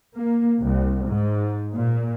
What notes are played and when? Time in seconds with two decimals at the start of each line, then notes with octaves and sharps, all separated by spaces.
0.16 A#3
0.62 C2
1.08 G#2
1.75 A#2